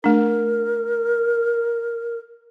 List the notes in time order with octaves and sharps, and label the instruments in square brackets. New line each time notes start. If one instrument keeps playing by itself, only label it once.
[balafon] A3 D4 [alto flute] A#4